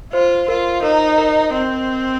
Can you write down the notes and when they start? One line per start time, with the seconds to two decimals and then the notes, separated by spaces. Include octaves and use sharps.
0.13 F4 C5
0.48 F4 A#4
0.83 D#4 A#4
1.18 A#4
1.53 C4